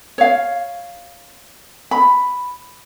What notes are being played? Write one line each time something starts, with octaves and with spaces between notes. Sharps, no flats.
C#5 F5
B5